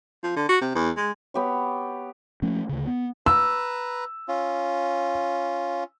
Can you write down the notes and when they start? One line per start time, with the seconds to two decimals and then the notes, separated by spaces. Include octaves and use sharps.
0.23 F3
0.36 D3
0.49 F#4
0.61 C3
0.75 E2
0.97 G#3
1.34 B3 G4 C#5
2.42 F3 A3 A#3 C#4
2.69 D2 C#3
2.87 B3
3.26 B4 A#5 E6
4.28 C#4 F4